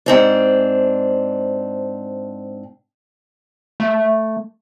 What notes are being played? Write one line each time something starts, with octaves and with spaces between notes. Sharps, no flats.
G#2 C4 D4
A3